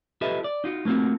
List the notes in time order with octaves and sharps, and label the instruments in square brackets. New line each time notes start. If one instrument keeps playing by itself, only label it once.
[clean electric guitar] F4 G4 A4 B4 D#5 E5
D5
D#4 F4 F#4
A3 A#3 C4 F4 F#4